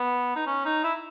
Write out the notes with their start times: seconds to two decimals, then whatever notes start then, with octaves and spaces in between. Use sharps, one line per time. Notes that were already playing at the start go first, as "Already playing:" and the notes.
Already playing: B3
0.35 D#4
0.47 C#4
0.65 D#4
0.84 E4